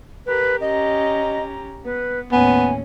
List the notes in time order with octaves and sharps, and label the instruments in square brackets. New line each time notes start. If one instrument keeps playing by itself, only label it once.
[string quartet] G4 A#4 [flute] B4
[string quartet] C#4 G4 A#5 [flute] D#5
[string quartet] B3 [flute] B4
[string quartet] D#2 A2 C#4 [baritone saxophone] B3 [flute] G#5